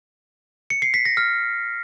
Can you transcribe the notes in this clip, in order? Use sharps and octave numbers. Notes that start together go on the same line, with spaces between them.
C#7
C7
B6
A#6
F6